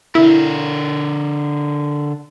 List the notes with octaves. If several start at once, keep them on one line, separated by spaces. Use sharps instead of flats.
D3 E4 A#4